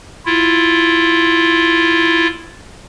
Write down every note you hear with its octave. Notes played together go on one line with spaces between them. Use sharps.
E4 F4